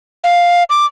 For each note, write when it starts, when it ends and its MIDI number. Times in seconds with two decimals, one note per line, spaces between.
0.24 0.64 77
0.70 0.86 86